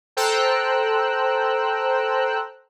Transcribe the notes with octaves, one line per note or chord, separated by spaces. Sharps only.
A4 C5 G5 A#5 E6 F#6